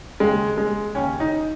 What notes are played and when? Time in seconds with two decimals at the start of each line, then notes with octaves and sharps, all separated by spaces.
0.20 D#2 C#3 G#3
0.58 G#3
0.95 D#2 C#3 C#4
1.20 D#4